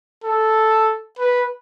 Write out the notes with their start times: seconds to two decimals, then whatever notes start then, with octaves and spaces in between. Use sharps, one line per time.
0.24 A4
1.19 B4